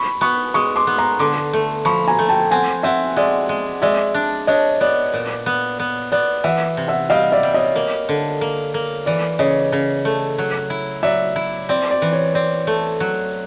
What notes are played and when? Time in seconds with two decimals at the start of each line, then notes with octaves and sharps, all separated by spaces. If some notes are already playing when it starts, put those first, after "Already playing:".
Already playing: B5 C#6
0.21 B3 B5 C#6
0.54 G#3 C#6 D#6
0.76 C6 D6
0.87 B3
0.98 A#5 C6
1.19 D3 C6 D6
1.53 A3
1.85 F3 B5 C#6
2.08 G#5 A#5
2.19 A3
2.29 G5 A5
2.51 C4 F#5 G#5
2.83 C4 E5 F#5
3.17 G#3 D5 E5
3.49 G#3
3.82 G#3 D5 E5
4.14 D4
4.47 D4 C#5 D#5
4.81 B3 D5
5.13 A#2
5.46 B3
5.80 B3
6.12 B3 D5
6.44 E3 E5 F#5
6.77 C3
6.88 E5 F#5
7.10 G3 D#5 F5
7.32 D5 E5
7.43 G3
7.54 C#5 D#5
7.76 A#3
8.09 D3
8.41 A#3
8.74 A#3
9.06 E3 D5
9.39 C#3 C#5 D#5
9.72 C#3
10.05 A3
10.38 F#3
10.70 E4
11.03 F#3 D5 E5
11.36 E4
11.69 C4 D5
11.91 D5
12.02 E3
12.13 C#5
12.34 C4 D5
12.67 A3
13.00 F#3